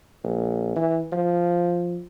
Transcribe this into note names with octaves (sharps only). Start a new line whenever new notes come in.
A#1
E3
F3